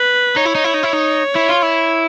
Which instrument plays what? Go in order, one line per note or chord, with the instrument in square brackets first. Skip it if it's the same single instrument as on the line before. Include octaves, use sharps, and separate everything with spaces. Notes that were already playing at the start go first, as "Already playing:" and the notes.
Already playing: [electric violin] B4
[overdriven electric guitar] D#4 [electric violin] C#5
[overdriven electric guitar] E4
D#4
E4
D#4
E4
D#4
E4
F4
E4